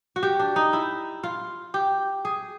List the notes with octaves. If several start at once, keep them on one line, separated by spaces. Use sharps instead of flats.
F#4
G4
D4
D#4
E4
F4
G4
G#4